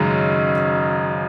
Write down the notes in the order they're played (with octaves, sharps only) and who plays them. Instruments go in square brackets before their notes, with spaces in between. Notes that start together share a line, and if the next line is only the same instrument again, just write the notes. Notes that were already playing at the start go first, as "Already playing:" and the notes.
Already playing: [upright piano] G#1 F#2 C#3 G#3 D#4